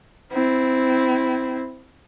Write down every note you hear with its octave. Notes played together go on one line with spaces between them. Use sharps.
C4 E4